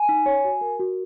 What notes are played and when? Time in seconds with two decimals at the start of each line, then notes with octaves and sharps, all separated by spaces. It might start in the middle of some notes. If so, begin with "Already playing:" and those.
Already playing: G#5
0.09 D#4
0.26 C#5
0.44 F#4
0.61 A#4
0.80 F#4